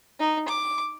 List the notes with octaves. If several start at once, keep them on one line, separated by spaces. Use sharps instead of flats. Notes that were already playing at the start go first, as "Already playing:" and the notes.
D#4
D6